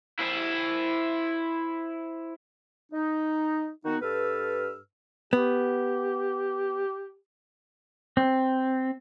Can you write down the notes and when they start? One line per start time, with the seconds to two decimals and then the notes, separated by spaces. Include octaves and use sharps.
0.19 E4 C5
2.92 D#4
3.85 D#3 B3 D#4 F#4
4.02 G2 A4 B4 E6 F6
5.33 B3 G4
8.17 C4